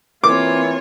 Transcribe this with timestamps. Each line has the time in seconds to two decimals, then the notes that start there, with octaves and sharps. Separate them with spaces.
0.24 E3 A#3 C4 F4 C#5 D6